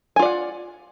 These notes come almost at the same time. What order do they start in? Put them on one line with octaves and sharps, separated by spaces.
G#5 F4 D5 F#5